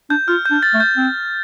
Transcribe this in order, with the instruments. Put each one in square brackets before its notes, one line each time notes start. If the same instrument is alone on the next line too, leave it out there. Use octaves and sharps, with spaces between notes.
[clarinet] D4 [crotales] G6
[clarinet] F4 [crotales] F6
[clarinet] D4 [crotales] G6
[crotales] A6
[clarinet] A3
[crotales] G6
[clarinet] C4